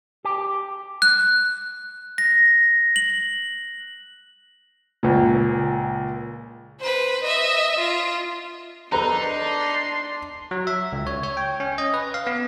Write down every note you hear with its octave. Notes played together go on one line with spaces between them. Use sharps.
G4
F#6
A#6
F#7
C#2 A#2
B4 C5
D#5 E5
F4
D4 D#4 A4 B4 A#5 C6
F#3
E5
C#2
C#5
C#5
G5
C#4
D#5
B4
F5
B3